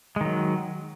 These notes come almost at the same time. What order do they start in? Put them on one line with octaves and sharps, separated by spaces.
G#3 D#3 F#3